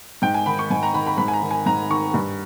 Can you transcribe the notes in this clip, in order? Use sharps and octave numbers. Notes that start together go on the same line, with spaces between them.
G#2 G5
G#5
D#3 B5
C#6
G#2 G#5
A#5
D#3 B5
B5
G#2 B5
G#5
A#5
D#3
G#5
G#2 A#5
D#3 C#6
G2